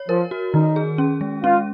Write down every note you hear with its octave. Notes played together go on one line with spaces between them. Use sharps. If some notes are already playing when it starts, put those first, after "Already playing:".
Already playing: C#5
F3 A#4
F#4
D#3 D#4
G#4
C#4
G#3
C#4 F4